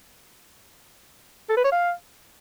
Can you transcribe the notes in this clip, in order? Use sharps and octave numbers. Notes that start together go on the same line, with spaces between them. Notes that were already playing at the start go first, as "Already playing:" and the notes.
A4
B4
C#5
F5